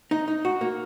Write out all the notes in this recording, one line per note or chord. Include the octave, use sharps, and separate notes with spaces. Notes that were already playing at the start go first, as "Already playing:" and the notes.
D#4
D#4
F#4
A#3